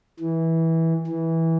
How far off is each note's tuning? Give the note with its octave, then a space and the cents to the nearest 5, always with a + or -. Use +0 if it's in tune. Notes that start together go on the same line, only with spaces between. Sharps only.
E3 -15
E3 -15